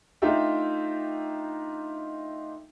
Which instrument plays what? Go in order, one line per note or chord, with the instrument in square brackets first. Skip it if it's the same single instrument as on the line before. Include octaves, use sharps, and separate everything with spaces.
[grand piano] A3 D4 D#4 F4 E5 G5